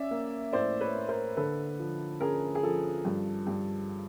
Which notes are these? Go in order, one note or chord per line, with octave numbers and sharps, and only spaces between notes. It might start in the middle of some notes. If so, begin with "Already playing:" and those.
Already playing: C#4 D5 E5
A#3
A2 C5 D5
B4 C#5
A#3
A#4 C5
D3 A4 B4
F3
C#4 G#4 A#4
G#4
F3 A4
G2
G2